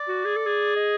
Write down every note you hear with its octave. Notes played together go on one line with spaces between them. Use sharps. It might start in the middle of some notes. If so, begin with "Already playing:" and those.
Already playing: D5
F#4
G#4
A4
G#4
D#5